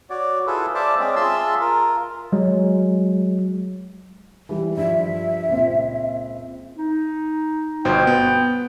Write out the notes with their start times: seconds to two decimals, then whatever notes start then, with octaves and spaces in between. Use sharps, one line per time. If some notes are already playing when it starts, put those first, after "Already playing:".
0.10 F#4 C#5 D5
0.47 E4 F4 G#4 A4 B4
0.75 C5 D5 E5 F5 A5
1.00 G#3 C4 C#4 D5 D#5
1.16 F4 G#4 E5 A5 C6 E6
1.61 F4 A#4
2.32 F#3 G#3
4.49 E3 G3 E4
4.77 G2 F3 E5
5.49 C#2 A#2 C4
6.77 D#4
7.85 G1 B2 C5 G5
8.07 B3